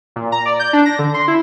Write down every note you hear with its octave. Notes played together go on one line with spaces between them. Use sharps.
A#2
A#5
D5
G6
D4
A#6
D3
C6
E4